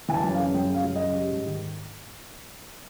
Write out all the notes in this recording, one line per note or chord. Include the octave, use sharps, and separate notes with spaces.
E3 G#5
A5
F#2
F5
C#3
F#2 G5
C#3 F5
F#2
C#3 D#5
G3
G#2
D#3